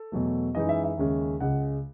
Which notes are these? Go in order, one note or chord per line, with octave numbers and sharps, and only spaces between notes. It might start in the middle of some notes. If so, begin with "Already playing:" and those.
Already playing: A4
E2 B2 F#3 A3
F#2 E3 G#3 D#4 D#5
E5
E5
D#2 C#3 G#3 C#4
C#2 C#3 G#3 F#5